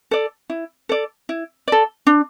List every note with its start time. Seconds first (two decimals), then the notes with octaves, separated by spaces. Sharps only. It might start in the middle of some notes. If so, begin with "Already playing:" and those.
0.11 A4 D5
0.50 E4
0.89 A4 D5
1.29 E4
1.68 A4 D5
2.07 D4